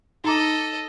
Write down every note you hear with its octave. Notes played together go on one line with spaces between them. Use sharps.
D#4 A4 D#5 A#5 D6